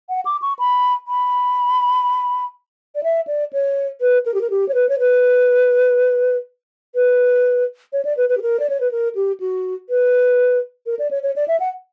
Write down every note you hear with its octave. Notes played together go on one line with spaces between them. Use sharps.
F#5
D6
C#6
B5
B5
D5
E5
D5
C#5
B4
A#4
G4
A#4
G4
C#5
B4
C#5
B4
B4
C#5
D5
B4
B4
G4
A#4
D5
C#5
B4
A#4
G4
F#4
B4
A#4
D5
C#5
C#5
D5
E5
F#5